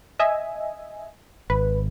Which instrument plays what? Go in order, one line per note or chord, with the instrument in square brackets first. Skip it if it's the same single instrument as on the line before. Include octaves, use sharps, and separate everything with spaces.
[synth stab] D#5 E5 G#5
[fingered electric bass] G#1 [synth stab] B4